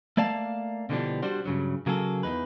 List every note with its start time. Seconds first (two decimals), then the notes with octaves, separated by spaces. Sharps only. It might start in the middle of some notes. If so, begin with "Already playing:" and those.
0.17 A3 A#3 D5 F5 A5
0.89 B2 D3 E3 F3 G3 D4
1.22 G3 D4 F#4 C5
1.45 G2 C#3 F#3
1.86 C#3 F#3 A#3 G#4 A4
2.23 E2 G#2 D#4 B4